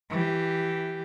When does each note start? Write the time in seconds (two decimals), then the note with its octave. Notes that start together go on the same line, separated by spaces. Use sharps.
0.10 E3 G4